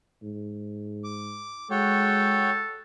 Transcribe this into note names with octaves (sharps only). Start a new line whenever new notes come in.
G#2
D6
G#3 F#4 A4 C#5 G5